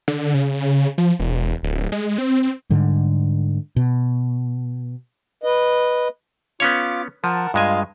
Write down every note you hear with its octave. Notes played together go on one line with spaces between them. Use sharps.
D3
C#3
F3
E1
D1
G#3
C4
G#2 D3 G3
B2
B4 D#5
B3 C#4 F4 C#5 D6
F3 A#4 F#5 A5
G2 G#3 F4 D#5 F5 G#5